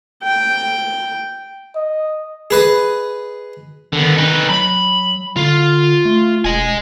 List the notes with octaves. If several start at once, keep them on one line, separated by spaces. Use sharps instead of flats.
G5
D#5
G#4 B4 D#5
D3 D#3 B3
D#4 B4
F#3 B5
D3 F4
A3
E1 D#5 G#5